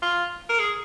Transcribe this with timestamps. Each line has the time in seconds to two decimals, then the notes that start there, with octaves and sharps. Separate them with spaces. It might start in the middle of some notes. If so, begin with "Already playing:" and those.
0.02 F4
0.49 A#4
0.59 G#4